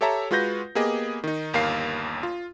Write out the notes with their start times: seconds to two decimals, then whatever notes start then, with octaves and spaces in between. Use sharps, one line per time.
0.01 G4 A4 C#5 E5 A5 A#5
0.31 G#3 F4 F#4 B4 G6 A#6
0.75 A#3 B3 G4 G#4 D#5
1.24 D#3 D#4
1.53 G1 D#2 A#3 F5 C7
2.23 F4